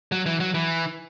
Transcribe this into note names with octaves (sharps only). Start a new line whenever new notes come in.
F#3
E3
F#3
E3